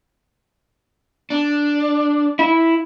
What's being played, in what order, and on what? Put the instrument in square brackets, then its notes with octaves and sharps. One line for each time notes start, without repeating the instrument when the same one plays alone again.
[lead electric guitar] D4
[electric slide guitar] E4